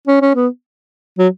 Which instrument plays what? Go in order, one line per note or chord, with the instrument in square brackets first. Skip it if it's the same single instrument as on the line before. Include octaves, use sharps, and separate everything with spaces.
[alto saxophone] C#4
C#4
B3
F#3